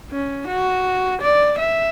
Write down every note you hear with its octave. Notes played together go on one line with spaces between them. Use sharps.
C#4
F#4
D5
E5